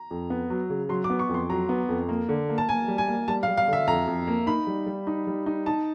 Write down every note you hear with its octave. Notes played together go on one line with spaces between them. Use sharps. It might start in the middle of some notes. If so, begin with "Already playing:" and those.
Already playing: A#5
F2
B3
F#3
C#3
F#3 C6
D6
B3
C#6
F2
C6
F#3 A#5
B3
F2
A#3
D3
A#3
A5
A#3 G#5
G3
G#5
A#3
G3 A5
F5
G3
F5
D3 E5
F2 A#5
F2
A#3
D#4 B5
G3
G3
D#4
G3
D#4
D#4 A5